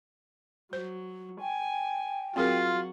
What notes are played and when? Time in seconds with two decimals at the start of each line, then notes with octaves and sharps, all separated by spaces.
0.73 F#3 C5
1.41 G5 G#5
2.36 F#3 C4 F4 F#4 G#4 A#4